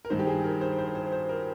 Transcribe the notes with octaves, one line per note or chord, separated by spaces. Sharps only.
A#4
G2 D#3 C5
G4
G#4
A#4
C5
C5
C5
C5
A#4